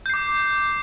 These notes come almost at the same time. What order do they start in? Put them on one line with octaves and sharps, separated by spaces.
G6 C7 D6